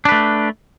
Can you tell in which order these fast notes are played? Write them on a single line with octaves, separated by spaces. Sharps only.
D4 B4 A3